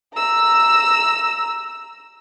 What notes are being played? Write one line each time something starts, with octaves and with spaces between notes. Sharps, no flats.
A#5 E6